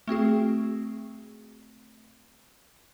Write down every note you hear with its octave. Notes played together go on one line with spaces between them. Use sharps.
A3 C4 F#4 G#4